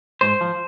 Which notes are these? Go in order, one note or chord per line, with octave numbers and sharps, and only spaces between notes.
G#2 C5
F3